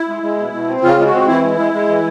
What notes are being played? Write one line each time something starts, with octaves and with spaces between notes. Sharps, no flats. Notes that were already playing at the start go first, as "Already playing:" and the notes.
Already playing: E4
G#3
G#3
B2
B2
C4
C#3 F4
G#3
F#4
C4
E3 E4
G#3
G#3
G#3
E3